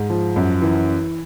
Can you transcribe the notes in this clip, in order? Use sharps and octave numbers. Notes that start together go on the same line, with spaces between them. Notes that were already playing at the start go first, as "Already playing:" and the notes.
Already playing: G#2
F3
F#2
E3